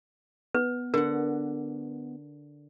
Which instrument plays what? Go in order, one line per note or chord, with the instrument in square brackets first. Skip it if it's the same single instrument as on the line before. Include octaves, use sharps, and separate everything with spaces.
[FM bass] B3 [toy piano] B4
[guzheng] D3 F#5 [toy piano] A#4